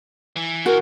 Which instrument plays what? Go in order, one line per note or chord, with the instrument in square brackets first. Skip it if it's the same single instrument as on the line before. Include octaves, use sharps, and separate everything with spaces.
[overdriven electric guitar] E3
[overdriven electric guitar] C#2 E3 [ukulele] F#4 [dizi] A#4